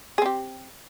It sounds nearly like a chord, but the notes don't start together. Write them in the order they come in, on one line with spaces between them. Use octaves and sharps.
G#4 C4 G4